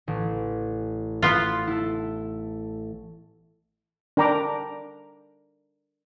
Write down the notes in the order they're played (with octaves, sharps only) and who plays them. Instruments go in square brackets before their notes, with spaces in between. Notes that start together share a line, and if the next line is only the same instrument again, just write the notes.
[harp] A1
[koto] B3 F4
[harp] E4 A4
[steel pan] D4 A#4 G5 A#5 B5 D6